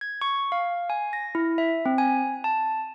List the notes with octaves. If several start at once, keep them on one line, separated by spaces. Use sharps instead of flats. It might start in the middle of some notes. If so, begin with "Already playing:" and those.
G#6
C#6
F5
G#5
A#6
E4
E5
C4
G#5
A5